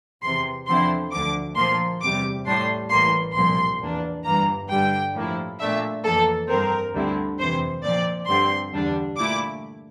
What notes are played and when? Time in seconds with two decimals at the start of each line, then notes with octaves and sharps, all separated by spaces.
0.22 E2 C3 E3 C6
0.67 E2 D3 F3 C4 E4 C6
1.12 D2 D3 F3 D6
1.56 A#2 F3 A#3 C6
2.01 E2 C3 G3 D6
2.46 A2 G3 D4 C6
2.91 A1 A2 E3 A#3 C6
3.35 C2 A#2 F3 C6
3.80 E2 E3 A#3 D4
4.25 G1 G2 E3 A#3 A#5
4.70 G2 D3 G3 G5
5.14 A2 F3 A#3 E4
5.59 A#2 A3 D4 E5
6.04 F2 E3 A#3 A4
6.49 G2 F3 C4 A#4
6.94 D2 D3 G3 C4 E4
7.39 F2 C3 E3 C5
7.83 A#2 F3 C4 D5
8.28 G2 D3 G3 C4 C6
8.73 E2 D3 G3 D4
9.17 A#2 A3 E4 D6